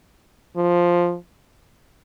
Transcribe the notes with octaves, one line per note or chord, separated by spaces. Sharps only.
F3